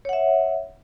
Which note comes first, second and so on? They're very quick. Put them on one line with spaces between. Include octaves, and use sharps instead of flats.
C#5 F#5 E5